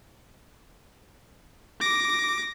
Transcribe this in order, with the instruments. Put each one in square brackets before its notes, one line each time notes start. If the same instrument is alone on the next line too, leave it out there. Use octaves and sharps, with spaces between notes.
[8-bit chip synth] D6 [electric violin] A#6